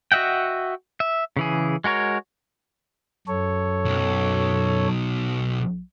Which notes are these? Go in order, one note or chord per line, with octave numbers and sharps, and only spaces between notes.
F#4 D#5 E5 F#5 G5
E5
C#3 E3 G#4
G#3 F#4 A#4 C#5
F#2 A4 C#5
B1